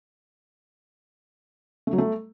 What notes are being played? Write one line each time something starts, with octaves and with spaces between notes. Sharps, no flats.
A3
F#3
A3